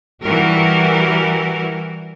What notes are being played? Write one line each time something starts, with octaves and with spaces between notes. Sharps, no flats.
E3 G3 F#4 G4 A#4